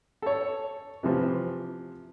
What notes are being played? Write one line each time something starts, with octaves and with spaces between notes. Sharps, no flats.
A4 C#5
C3 E3 F3